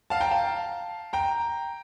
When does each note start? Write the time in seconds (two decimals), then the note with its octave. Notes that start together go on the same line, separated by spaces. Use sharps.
0.10 F5 A5
0.21 G5 A#5
0.31 F5 A5
1.13 G5 A#5